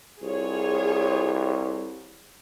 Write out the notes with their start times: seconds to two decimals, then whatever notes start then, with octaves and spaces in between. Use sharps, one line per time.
0.22 C2 F4 G#4 C#5